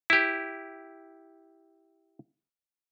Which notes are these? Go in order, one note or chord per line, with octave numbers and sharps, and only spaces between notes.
E4 G4